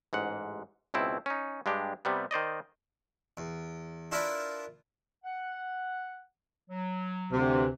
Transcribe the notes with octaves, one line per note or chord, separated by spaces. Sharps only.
A1 G#2 F#5
C#2 B2 C4 E4
C#4 D#4
G2 G#3 D4 G4
C3 G3 B3
D#3 C5 D5 D#5
E2
D4 E4 F4 A#4 B4 D5
F#5
F#3
D2 C3
E3